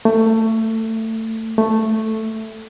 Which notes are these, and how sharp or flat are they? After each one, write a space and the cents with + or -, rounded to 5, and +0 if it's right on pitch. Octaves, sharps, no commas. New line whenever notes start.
A3 +20
A3 +0